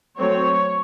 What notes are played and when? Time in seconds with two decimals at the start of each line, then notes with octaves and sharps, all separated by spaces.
0.18 F#3 A3 C4 C#5